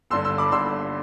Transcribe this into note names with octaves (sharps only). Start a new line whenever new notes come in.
G1 G2 D3 C6 E6
C6 E6
B5 D6
G1 G2 D3 C6 E6